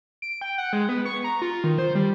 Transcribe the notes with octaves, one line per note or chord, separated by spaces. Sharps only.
D7
G5
F#5
G#3
B3
C#6
A#5
F4
D#3
C5
G3